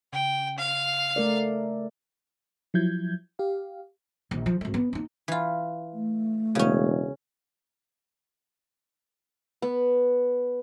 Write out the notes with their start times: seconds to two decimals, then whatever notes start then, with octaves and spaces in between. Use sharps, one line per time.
0.13 C#3 G5
0.58 F5
1.16 A3 A#4 D5
2.74 F3 F#3 E4 G6 G#6
3.39 G4 F5
4.31 A#1 D#3
4.46 F3
4.61 G#1 A3
4.74 B3
4.93 A#3 D#4
5.28 E3 F4
5.93 A3
6.55 E1 C#3 C#4
9.62 B3